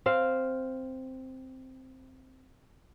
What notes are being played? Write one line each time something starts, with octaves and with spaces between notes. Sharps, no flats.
C4 F5